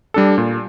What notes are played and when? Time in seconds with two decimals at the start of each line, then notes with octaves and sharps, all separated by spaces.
0.14 G3 D4 A4
0.38 A#2